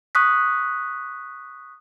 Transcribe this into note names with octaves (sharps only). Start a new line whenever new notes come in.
C#6 D#6 F#6 B6